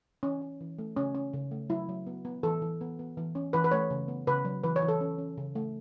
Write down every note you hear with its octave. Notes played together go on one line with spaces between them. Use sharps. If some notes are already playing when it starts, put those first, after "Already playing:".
E3 C#4
C#4
E3
A3
C#3 C#4
C#4
C#3
A3
F#3 E4
F#3
B3
B3
E3 A4
E3
B3
B3
E3
C#4
E3 B4
B4
A3 C#5
C#3
B3
C#3 B4
F#3
E3 B4
C#5
E3
A4
C#4
C#4
C#3
A3